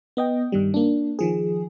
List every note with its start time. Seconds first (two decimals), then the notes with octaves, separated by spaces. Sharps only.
0.17 B3 D#5 G5
0.52 G2 D#3 G3
0.74 A#3 D4
1.19 D#3 F3 G#4